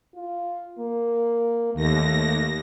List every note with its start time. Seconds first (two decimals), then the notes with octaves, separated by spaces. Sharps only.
0.15 F4
0.79 A#3
1.74 D#2 A3 A#6